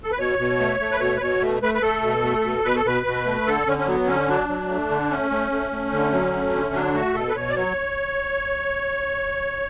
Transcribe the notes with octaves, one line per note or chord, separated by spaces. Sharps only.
A4
B4
B2 C#5
B2
A3
A3
B4
B2 C#5
B4
B2 C#5
A3
A3 B4
B4
A3 A4
B2
A3
B2
B2 B4
A4
B2 B4
B2
A3
D3 A4
D3 C#4
C#4
F#3 B3
D3 C#4
F#3 D4
F#3
A3
D3
A3 C#4
A3
A3
A3
D3
F#3
A3
D3
F#3 D4
A3 F#4
B2 A4
B4
B2 C#5
D5
F#3 C#5